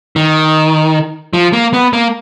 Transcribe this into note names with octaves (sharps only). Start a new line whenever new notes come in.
D#3
F3
A#3
B3
A#3